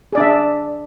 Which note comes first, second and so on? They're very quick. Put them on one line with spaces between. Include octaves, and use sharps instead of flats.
G#4 D5 D4 E5